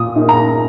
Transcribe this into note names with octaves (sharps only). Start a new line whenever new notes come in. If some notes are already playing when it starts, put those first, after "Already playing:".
Already playing: A#2 D#6
A#3 D#4
A#5